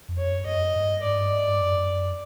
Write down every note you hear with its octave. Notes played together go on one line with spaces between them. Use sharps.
F2
C#5
F#2
F#2 D#5
G2
G#2 D5
G2
G#2
G2
F#2